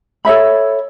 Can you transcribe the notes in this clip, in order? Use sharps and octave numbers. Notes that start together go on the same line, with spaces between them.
A4 C#5 E5 B5